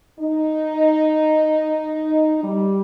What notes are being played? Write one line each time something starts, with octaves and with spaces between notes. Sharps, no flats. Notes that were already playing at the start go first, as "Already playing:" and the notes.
D#4
G3